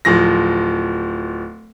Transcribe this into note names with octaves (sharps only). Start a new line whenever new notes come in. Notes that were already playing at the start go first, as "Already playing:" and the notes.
D1 F3 A#6